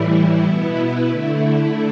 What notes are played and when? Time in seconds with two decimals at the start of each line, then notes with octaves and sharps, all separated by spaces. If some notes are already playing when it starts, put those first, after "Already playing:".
Already playing: A2 E3 G3 E4
0.43 B2 B3 E4
1.11 D3 A3 E4